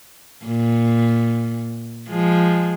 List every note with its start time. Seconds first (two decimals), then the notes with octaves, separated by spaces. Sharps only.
0.45 A#2
2.09 F3 G#3